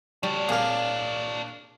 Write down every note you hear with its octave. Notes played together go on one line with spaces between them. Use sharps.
G3 D4 C#5
A#2 A#3 G#4 F5